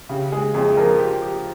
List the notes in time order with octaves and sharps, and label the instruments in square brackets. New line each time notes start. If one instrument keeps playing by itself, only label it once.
[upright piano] C#3 [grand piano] G4
[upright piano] G#3 [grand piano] G#4
[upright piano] F2 [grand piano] G#4
[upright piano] F3 [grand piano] A#4
[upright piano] G4
G4